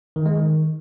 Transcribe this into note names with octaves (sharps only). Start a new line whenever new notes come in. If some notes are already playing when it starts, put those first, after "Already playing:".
D#3
G#3
D#3